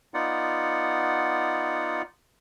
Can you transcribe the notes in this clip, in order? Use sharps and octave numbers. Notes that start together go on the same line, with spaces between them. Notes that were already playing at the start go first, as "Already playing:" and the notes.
B3 D#4 F4 D5 F#5